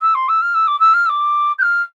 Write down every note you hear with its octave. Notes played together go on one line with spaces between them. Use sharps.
E6
C6
E6
F6
E6
D6
E6
F6
E6
D6
G6
F6